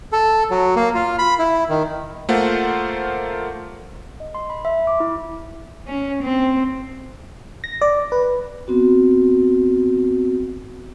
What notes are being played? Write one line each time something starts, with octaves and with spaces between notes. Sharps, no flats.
A4
F#3
A#3
F4
B5
E4
D#3
A3 A#3 F4 C5 F#5
D#5
C6
B5
E5
D6
E4
C#4
C4
A#6
D5
B4
B3 C4 F#4